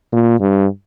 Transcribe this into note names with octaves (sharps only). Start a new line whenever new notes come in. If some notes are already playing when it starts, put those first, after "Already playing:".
A#2
G2